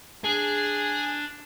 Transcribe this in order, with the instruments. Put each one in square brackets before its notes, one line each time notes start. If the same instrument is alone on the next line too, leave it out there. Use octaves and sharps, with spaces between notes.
[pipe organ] D4 [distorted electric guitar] G#4